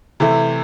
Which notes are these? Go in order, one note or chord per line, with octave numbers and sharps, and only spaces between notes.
C3 E3 A3 E4